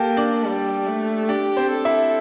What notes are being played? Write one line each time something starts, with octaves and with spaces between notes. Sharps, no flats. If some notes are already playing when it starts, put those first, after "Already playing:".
Already playing: A#3 G4 A4 G5 A5
D4 D5
G3
A3
D4 G4 D5
C4 C5
A4
E4 E5